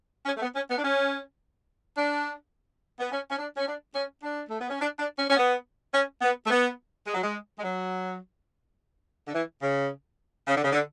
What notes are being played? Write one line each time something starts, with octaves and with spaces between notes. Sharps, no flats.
C#4
A3
B3
C#4
B3
D4
C#4
D4
B3
C#4
C#4
D4
C#4
D4
C#4
D4
A3
B3
C#4
D4
D4
C#4
C#4
B3
C#4
B3
A3
B3
G#3
F#3
G#3
G#3
F#3
D3
E3
C#3
C#3
D3
C#3
D3